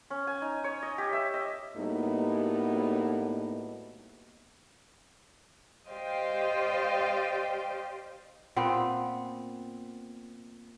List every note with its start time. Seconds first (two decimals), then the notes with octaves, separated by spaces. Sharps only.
0.10 C#4
0.27 G#5
0.42 D#4
0.64 C#5
0.83 D#5
0.98 G4
1.13 E5
1.34 D#5
1.76 A2 G3 A#3 B3 D#4 F#4
5.89 G4 C5 D5 D#5 F5 G5
8.56 A#2 B3 C4